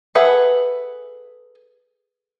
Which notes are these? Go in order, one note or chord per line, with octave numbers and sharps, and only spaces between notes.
G#4 A4 B4 E5 F#5